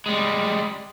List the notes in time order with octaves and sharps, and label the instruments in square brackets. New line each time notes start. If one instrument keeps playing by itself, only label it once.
[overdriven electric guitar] G3 G#3